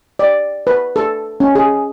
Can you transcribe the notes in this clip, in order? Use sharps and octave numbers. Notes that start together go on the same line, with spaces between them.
D5
B4
A4
C#4
G#4